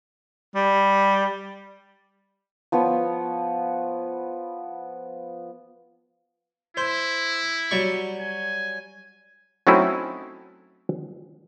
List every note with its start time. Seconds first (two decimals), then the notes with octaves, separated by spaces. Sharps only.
0.55 G3
2.72 F3 B3 C#5
6.77 E4 C5
7.71 F#3 G3 C#6
8.21 G#5
9.67 F#3 A3 C4 C#4 D#4 E4